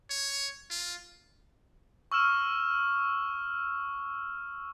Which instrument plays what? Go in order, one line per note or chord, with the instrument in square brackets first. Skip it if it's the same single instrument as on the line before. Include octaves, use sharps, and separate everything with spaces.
[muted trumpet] C#5
F4
[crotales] C#6 E6 F6 E7